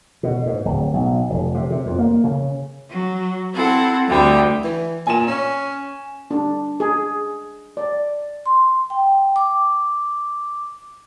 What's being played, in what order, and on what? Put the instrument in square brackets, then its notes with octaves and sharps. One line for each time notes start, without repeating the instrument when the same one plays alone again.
[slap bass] B2
G#2
D1
B1
F1
C3
C3
F2
A#3
C#3
[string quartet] F#3
C4 E4 A4 F#5
D2 D3 G3 G5
[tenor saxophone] E3
[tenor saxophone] A#2 [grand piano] G#5 E7
[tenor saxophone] C#4
[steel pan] D4
G#4
D5
[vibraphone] C6
G5
D6